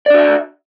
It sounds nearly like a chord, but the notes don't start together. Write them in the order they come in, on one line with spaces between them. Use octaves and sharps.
D5 D4 F#4 E5